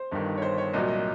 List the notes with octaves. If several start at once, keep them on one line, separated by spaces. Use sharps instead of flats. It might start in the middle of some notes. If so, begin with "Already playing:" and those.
Already playing: C5
G1 G2 D#3
C#5
C5
C#5
C2 A#2 F#3 D#5
D#5